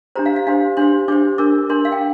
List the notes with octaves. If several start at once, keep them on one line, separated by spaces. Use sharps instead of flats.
D4 G4 C5 A#5
F5
F5
D4 G4 C5 F5
D4 G4 C5 C6
D4 G4 C5 D6
D4 A#4 D6
D4 A#4 C6
F5
G5